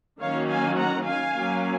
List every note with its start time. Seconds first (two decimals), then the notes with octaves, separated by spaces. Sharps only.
0.21 D#3 F#3 A#3 C#4 C#5 F5
0.49 F5 G#5
0.78 F#5 A#5
1.07 F5 G#5
1.36 F#3 A#3 C#4